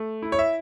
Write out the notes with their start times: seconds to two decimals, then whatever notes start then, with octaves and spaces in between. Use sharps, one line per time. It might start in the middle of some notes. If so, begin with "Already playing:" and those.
Already playing: A3
0.22 E4
0.32 C#5
0.39 E5